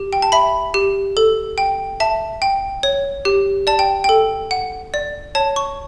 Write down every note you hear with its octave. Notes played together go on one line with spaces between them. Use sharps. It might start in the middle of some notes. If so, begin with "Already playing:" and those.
Already playing: G4
G5
A5
E5 B5
G4
A4
G5
E5 A5
G5
C#5
G4
D5 A5
G5
A4 G5
F#5
D5
C#5 A5
C#6